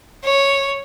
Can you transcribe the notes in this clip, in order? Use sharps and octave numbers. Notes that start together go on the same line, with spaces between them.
C#5